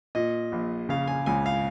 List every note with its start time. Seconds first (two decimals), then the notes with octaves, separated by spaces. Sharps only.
0.15 A#2 D#5
0.52 A#1
0.89 C#3 F5
1.07 G#5
1.26 C#2 G#5
1.46 F5